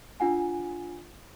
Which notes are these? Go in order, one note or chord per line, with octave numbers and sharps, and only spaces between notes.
D4 F4 F#5 G#5